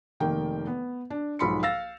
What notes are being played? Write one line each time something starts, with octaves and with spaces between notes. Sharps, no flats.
F1 D#3 A#3 G5
B3
D4
B1 G#2 F3 B5 C6 C#7
F5 E6 A6 A#6